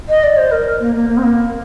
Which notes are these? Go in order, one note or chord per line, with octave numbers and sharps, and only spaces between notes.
D#5
D5
C5
A#4
A#3
A#3
A#3
C4
A#3